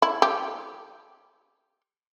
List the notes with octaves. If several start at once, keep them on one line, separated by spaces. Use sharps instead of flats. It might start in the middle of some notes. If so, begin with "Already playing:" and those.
E4
G4